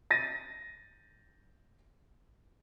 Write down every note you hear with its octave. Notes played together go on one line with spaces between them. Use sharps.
A6 A#6 D#7